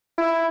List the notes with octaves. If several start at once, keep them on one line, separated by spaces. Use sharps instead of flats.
E4